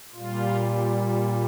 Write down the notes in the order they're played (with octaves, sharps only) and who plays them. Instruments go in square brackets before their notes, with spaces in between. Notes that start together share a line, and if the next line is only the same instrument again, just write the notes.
[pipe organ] A#2 G3 F4